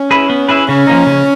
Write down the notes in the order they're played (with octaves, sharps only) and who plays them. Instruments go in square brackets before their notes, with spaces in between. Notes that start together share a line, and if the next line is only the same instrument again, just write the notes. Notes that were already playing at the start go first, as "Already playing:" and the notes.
Already playing: [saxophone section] C#4
[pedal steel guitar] E4 G#4 B4
B3
E4 G#4 B4
[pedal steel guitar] C#3 [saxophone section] C#4
[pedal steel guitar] F3 A#3 D#4
C#3